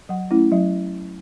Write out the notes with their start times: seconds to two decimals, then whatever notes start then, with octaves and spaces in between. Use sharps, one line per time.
0.09 F#3 F#5
0.31 A3 C#4 E4
0.52 F#3 E5